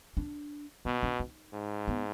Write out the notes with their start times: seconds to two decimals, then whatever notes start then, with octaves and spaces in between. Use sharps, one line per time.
0.17 D4
0.85 B2 B3
1.03 D4
1.20 D#4
1.53 G#2
1.88 B3